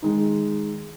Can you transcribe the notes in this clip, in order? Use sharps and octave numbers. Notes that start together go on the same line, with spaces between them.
D#3 G#3 D#4